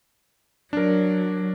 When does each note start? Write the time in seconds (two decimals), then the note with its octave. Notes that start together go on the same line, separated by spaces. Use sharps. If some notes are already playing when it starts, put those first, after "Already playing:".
0.73 F#3 D4 A#4